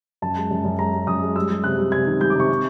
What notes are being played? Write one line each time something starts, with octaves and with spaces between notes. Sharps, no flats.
F#2 A5
G#3
F#2
F#2
G#3 A#5
G#3
F#2 D#6
G#3
G3 E6
G3
C3 F#6
G3
C3 G#6
D#3
G3 G6
D6
C3 C#6
C3